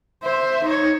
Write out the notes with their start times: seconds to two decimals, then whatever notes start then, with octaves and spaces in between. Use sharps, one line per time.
0.23 C5 E5
0.64 D#4 C#5